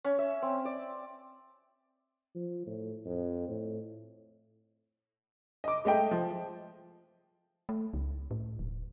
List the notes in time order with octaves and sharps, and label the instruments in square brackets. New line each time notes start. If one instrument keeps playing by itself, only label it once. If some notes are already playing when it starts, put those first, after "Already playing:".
[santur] C#4
E5
C4
D5
[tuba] F3
A2
F2
A2
[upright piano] D#5 D6
G#3 A3 D#5 G5
F3
[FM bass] A3
C#2
A2
D#1